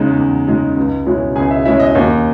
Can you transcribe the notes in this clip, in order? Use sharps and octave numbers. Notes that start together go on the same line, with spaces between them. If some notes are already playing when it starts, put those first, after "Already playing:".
Already playing: E2 C#3 G#3 D#4
E2
C#3 G#3 D#4
C#2
B2 G#3 C#4 E4
C#2 G#4 G#5
E5
B2 G#3 C#4 E4 E5
D#5
D#2